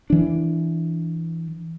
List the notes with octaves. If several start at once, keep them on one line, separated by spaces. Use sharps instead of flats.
E3 D4